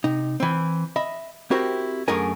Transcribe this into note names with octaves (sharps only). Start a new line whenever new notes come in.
C3 D#4
E3 C4
D#5 E5 B5
C4 E4 F#4 G4 A#4 C5
F#2 D3 A3 G#4 A#4 G#5